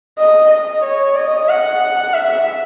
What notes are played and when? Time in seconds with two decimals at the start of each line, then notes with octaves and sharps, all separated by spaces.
0.18 D#5
0.51 D#5
0.84 C#5
1.16 D#5
1.48 F#5
2.14 E5